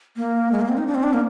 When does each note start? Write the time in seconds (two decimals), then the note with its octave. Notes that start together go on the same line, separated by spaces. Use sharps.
0.16 A#3
0.52 G#3
0.61 A#3
0.69 C4
0.77 D#4
0.87 D4
0.95 C4
1.03 D4
1.13 A#3